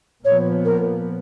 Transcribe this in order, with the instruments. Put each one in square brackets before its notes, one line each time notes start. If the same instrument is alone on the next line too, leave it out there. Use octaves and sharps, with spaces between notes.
[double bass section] A#2 F3 B3 [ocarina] C#5
[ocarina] A#4